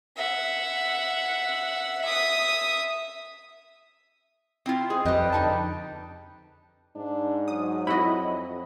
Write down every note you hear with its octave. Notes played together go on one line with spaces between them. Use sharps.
E5 F#5
E5 D#6
C4 E4 F4
G#3 C4 G#4
F2 G3 B4 D#5 G5
D3 D#4 A5
G#2 D4
F#3 D#6
F2 E4 F#4 D#5 B5